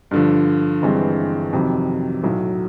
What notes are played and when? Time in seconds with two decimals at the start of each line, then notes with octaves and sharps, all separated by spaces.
0.11 G2 D3 F3
0.82 G1 G2 E3 G#3 C4
1.53 F2 C3 D#3 F#3
2.23 B1 A2 F#3